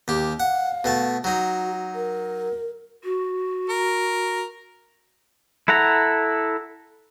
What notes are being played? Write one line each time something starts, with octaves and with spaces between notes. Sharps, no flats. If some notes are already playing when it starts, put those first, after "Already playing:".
D#2 G4
F5 F#5
B2 A3 A5
F#3 D#4 F#4
A#4
F#4
A#4
E4 A4 F#5 A#5